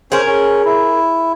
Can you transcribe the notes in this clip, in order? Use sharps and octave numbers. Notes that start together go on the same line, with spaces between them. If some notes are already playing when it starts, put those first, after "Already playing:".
C#4 G#4 A#4 C5
C#4
E4